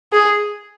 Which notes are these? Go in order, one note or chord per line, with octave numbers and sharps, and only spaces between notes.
G#4